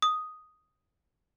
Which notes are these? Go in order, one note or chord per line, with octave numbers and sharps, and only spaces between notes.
D#6